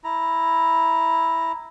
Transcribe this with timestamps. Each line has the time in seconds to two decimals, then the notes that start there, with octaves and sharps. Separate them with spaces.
0.04 E4 A#5